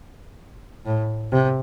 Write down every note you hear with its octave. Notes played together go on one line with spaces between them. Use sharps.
A2
C3